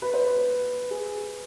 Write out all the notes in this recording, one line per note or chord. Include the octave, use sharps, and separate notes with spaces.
B4
C5
B4
G#4